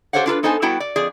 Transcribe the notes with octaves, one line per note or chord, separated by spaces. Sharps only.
G4 A4 C5 C#5 F5 F#5
D4 F4 A4 B4
B3 D#4 A4 C5 G#5 A5
G3 B3 E4 F#4 G5 A5
D5
F2 G#4 D5